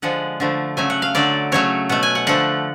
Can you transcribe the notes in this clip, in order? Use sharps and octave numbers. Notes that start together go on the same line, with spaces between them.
D3 F3 G#3 F#5
D3 F3 A3
C#3 F#3 A3 G#5
F#5
F5
D3 F#3 A3 D5
C#3 F#3 A3 C#5
B2 A3 F#5
G#5
F#5
D3 F3 A3 F#5